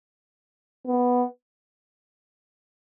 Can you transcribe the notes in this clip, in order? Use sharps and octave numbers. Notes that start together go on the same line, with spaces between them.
B3